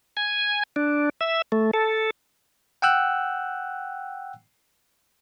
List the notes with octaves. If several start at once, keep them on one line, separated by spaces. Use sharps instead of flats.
G#5
D4
E5
A3
A4
F#5 G5 E6 F#6